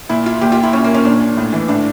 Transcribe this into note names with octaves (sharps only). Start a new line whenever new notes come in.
A#2 E4
F4
A#2 G4
F4
E4
A#2 C#4
A#3
C#4
A#2 D4
A2
E3
A2 D4